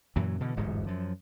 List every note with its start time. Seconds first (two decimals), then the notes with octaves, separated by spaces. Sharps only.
0.16 F#2 A#2 E3 F#3
0.40 B2 D3 E3
0.56 D1 G1 E2 G#2
0.87 F#2 F3